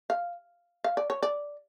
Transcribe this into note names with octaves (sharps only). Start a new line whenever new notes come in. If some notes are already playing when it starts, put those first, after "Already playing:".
F5
F5
D5
C#5
D5